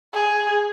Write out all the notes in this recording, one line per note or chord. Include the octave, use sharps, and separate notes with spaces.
G#4